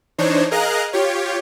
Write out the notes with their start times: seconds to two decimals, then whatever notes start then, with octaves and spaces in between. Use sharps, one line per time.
0.18 E3 D4 D#4 C5 C#5
0.51 G#4 A#4 D#5 F5 A#5 F#6
0.93 F4 G4 C#5